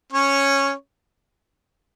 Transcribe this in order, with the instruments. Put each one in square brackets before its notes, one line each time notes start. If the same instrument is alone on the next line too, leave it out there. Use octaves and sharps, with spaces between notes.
[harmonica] C#4 C#5